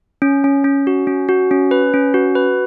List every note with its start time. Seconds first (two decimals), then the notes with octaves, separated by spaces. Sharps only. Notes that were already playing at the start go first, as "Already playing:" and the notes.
0.22 C#4
0.44 C#4
0.64 C#4
0.87 F#4
1.07 C#4
1.29 F#4
1.51 C#4
1.71 B4
1.94 C#4
2.14 F#4
2.35 B4